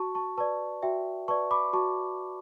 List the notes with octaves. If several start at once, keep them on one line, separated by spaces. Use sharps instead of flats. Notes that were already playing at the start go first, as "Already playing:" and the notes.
Already playing: F#4 A5 C#6
A5 C#6
B4 D5 A5 C#6
F#4 E5 G5
B4 D5 A5 C#6
B5 D6
F#4 A5 C#6